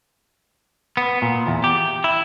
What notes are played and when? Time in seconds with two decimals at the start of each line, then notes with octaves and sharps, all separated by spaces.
0.97 B3
1.22 A#2
1.47 E2
1.64 G4
2.04 E4